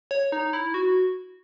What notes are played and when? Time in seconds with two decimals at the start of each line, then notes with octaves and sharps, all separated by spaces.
0.11 C#5
0.32 D#4
0.53 E4
0.74 F#4